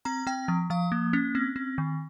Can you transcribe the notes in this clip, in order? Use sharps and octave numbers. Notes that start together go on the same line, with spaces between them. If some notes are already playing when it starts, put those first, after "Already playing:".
C4 A#5
C4 G5
F3
F3 F5
A#3
C#4
C4
C4
D#3